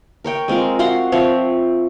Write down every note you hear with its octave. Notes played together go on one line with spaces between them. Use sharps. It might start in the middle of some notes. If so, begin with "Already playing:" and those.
A#4 C#5 G5
G#3 C4 F4 A#4
F#4 F5 F#5 C6
F3 C4 C#5 E5